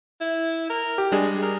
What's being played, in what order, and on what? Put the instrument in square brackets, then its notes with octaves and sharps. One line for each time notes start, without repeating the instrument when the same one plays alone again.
[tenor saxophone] E4
A#4
[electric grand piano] G4
[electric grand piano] G3 D4 G#4 [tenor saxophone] G#3
[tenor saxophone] A#4